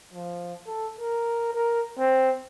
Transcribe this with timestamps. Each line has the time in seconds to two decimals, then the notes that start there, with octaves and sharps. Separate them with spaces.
0.13 F3
0.66 A4
0.99 A#4
1.52 A#4
1.98 C4